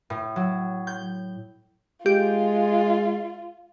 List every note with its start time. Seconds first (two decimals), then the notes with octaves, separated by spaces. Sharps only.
0.10 A2
0.36 F#3
0.87 G6
2.06 G#3 F4 G4